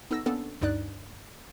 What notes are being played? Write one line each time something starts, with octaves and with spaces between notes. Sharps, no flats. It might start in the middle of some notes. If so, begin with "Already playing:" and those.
B3 D#4 A4 E6 A#6
A#3 B3 C#4 D4 A4
D2 G2 D#4 D5 F#6